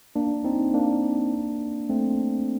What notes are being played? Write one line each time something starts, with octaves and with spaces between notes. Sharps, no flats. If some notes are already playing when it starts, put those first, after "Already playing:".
A#3 D4
C4 D#4
A#3 D4
A3 C4